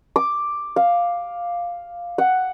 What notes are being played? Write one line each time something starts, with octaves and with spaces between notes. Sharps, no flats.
D6
F5
F#5